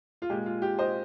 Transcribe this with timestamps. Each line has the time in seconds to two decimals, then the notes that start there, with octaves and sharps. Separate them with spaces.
0.22 F4
0.30 A#2 G#3 G4
0.46 F4
0.62 G4
0.79 C5 D#5